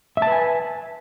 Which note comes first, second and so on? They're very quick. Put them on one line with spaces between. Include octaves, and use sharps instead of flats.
E5 A5 B4 G#5